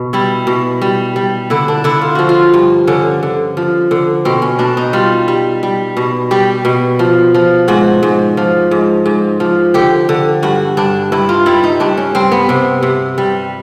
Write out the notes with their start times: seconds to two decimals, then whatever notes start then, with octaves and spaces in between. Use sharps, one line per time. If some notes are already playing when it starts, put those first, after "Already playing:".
Already playing: B2
0.13 G3 E4
0.47 B2
0.82 G3
1.16 G3
1.50 D3 E4
1.68 D4
1.84 D3 E4
2.01 F4
2.15 F3 F#4
2.29 F4
2.54 G2
2.88 D3 C#4
3.23 D3
3.57 F3
3.91 D3
4.25 B2 C4
4.42 C#4
4.59 B2 D4
4.77 D#4
4.93 G3 F4
5.28 G3
5.63 G3
5.97 B2
6.31 G3 G4
6.65 B2
6.99 F3
7.34 F3
7.68 G#2 F#4
8.03 G#2
8.37 F3
8.71 G#2
9.06 G#2
9.40 F3
9.74 D3 G4
10.09 D3
10.43 G2 F#4
10.77 G2 D4
11.12 G2 E4
11.29 F4
11.46 G3 E4
11.64 D#4
11.80 G2 D4
11.98 C#4
12.15 G2 C4
12.32 B3
12.49 C3
12.83 C3
13.18 G3